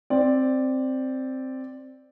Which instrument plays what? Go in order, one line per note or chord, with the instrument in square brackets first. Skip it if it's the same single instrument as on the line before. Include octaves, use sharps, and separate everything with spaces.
[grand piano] C4 D5